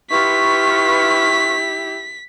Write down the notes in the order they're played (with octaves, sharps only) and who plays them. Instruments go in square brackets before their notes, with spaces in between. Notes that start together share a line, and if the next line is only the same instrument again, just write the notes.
[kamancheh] E4 G4 [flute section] F4 B4 C#6 [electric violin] B6